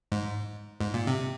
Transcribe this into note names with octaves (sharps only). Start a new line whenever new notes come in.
G#2
G#2
A#2
C3